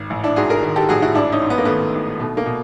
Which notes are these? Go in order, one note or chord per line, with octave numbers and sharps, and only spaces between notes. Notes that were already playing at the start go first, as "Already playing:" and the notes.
Already playing: G#1
A1
D4 E4
G#2 F#4 G#4
G#4 A#4
D#3
G4 A4
A1 F#4 G#4
E4 F#4
G#1 D4 E4
C#4 D#4
G#2
B3
A#3
D#3 A3 B3
G#1
B2 A3
A#3
B2